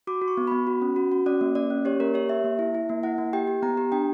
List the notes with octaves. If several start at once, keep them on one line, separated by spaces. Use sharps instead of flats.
F#4 D6
F#4
C#6
B3
B3 B5
F#4
C#4
F#4
F#4
C#4 D5
A#3
A#3 D5
C#4
G4 C#5
A#3 A#4
G4 C#5
G4 E5
A#3
E4
E4
A#3
E4 F#5
A#3
G4 G5
G4
B3 A#5
G4
D4 G5